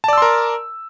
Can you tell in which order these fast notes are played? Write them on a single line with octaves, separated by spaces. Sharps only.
A5 D5 E6 C6 A#4